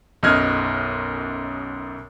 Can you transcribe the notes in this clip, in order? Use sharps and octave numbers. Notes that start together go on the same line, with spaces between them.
B1 F#2 D#5 F6 F#6 G#6